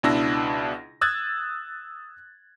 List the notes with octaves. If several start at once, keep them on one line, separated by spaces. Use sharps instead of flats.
C#2 B2 D4 E4 E6 A#6
D#6 E6 F#6 G#6 A6